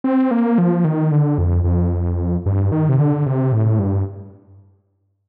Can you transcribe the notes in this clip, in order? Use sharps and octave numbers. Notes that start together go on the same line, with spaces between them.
C4
A#3
F3
D#3
D3
F2
F2
G2
D#3
C3
D3
C3
A2
G2